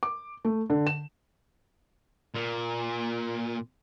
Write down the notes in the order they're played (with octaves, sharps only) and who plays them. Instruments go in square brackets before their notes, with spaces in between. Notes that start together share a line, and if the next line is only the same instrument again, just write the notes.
[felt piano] D6
A3
D3
E7
[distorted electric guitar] A#2